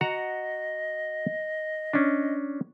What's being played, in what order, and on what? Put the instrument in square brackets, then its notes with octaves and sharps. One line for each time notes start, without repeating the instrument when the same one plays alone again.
[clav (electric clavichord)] F#4 F#5 A#5 [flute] D#5
[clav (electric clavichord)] C#4 D4